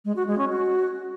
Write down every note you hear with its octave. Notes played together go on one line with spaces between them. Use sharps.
G#3
F#4
G#3
C#4
F#4